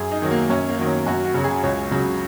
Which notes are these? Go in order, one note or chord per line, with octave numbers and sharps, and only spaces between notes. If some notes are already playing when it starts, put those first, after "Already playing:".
Already playing: F#2 G#4
D#4
D#3 F#3
A#3
F#2 C#4
A#3
D#3 F#3
C#4
F#2 F#4
F#4
C#3 F#3
G#4
C#2 C#5
C#3 F#3